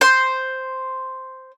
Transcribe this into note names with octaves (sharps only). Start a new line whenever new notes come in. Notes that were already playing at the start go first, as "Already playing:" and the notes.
C5 C6